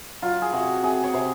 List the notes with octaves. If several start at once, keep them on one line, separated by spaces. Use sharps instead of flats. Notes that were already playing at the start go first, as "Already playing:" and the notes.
F#3 F4
G#4
C3 F#4
C3 G#4
C#5
C3 C5